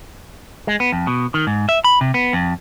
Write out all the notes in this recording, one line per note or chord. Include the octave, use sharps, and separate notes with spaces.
G#3
B3
F2
B2
D#3
G#2
E5
B5
C3
B3
F2